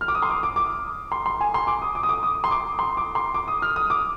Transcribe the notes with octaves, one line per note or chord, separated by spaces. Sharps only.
F6
D6
D#6
C6
D6
D6
D6
C6
C6
G#5
C6
D6
D#6
D6
D#6
D6
D#6
C6
D6
C6
D6
C6
D6
D#6
F6
D#6
D6